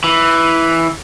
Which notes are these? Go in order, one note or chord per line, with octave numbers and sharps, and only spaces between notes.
E3